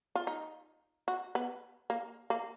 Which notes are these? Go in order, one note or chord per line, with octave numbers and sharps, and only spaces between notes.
F4
D#4
F#4
B3
A#3
A#3